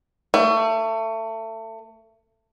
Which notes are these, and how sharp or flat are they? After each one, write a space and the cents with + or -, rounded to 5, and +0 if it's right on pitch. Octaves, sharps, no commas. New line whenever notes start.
A3 +25